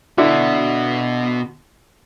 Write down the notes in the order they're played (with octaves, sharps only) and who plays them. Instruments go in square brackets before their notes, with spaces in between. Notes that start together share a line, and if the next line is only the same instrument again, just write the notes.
[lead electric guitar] B2 F#4 [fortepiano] D3 D4 E4